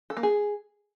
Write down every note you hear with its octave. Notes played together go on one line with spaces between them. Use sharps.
A4
A#3
G#4